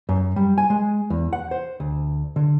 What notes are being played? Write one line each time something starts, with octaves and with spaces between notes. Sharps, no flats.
F#2
G3
G#5
G#3
E2
F#5
C5
D2
D3